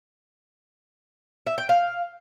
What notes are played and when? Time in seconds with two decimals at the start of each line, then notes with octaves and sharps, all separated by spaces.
1.47 E5
1.58 G5
1.69 F5